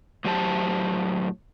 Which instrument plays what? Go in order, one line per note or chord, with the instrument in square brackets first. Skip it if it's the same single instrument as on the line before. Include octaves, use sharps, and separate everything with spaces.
[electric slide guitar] A2 F#3 G4 C5 A5